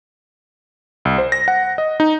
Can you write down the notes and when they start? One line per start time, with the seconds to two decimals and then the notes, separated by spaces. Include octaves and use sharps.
1.05 C2
1.18 C5
1.32 A#6
1.48 F#5
1.78 D#5
2.00 D#4